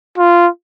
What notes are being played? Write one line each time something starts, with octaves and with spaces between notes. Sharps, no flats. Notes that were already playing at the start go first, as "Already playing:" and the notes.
F4